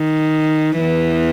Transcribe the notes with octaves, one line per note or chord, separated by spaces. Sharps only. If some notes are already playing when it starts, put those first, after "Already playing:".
Already playing: D#3
E2 E3